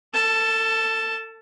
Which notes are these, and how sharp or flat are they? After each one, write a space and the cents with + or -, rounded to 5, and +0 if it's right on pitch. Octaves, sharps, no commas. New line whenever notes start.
A4 +35 A5 +0